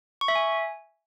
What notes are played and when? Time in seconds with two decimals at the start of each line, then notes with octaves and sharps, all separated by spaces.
0.21 C#6
0.28 E5
0.35 G#5